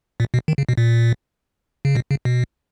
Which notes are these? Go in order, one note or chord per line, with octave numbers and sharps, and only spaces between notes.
A#2
B2
D#3
C#3
B2
A#2
C#3
B2
C#3
B2